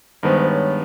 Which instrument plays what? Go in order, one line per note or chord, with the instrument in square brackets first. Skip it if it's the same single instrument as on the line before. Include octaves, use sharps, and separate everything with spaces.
[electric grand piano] G2 D#3 G#3 B3 [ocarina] C5
[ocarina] C5
C#5